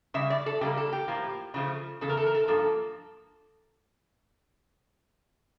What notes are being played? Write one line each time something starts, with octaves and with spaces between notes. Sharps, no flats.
C#3 G3 E5
D5
A4
C#3 G3 A#3 G4
A4
G4
A2 F3 A#3
C#3 F3 A3
E2 C#3 A4
A#4
A4
A#4
A4
G2 F3 A#3 A4